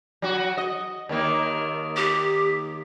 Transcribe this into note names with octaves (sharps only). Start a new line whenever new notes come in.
F#3 F#4
D#5
D#2 D#3 A#3
G4